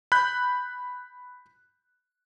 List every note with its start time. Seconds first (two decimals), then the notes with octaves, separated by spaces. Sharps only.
0.12 B5 F#6 G6